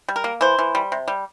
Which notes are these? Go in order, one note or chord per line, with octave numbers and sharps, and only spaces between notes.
G3
A#4
A#3
E3 C5
E3
G3
C3
G3